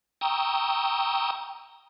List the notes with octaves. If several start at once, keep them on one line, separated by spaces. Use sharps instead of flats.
G5 A#5 C#6 D#6 E6